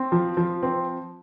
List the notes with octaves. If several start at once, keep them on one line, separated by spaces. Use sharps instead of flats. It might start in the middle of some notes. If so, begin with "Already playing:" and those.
Already playing: C4
F3
F3
C4